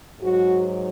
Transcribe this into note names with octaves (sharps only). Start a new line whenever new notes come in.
G#2 F#3 F#4